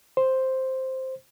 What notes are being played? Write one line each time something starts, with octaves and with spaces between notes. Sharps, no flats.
C5